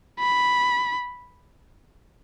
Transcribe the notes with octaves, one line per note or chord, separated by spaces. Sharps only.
B5